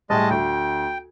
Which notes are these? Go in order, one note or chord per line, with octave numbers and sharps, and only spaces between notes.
A2 G3 G#3 D#5 A5
D2 G5